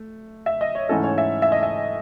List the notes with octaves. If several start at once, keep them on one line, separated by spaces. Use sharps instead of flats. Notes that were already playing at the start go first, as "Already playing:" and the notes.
Already playing: A3
E5
D#5
C#5
G#2 E3 A3 C#4 E4 A4
C#5
E5
E5
D#5
E5